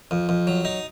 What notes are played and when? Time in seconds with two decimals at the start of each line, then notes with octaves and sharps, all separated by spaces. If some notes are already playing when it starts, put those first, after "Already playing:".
0.11 F2
0.29 F2
0.47 F#3
0.65 D#4